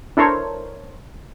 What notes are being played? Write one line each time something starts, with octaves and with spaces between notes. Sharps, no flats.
D4 E4 A4 A#4 C5 C#5